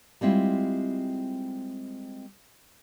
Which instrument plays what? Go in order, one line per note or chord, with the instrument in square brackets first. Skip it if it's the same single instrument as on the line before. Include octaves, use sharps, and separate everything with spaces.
[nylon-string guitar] G3 G#3 C4 E4 F4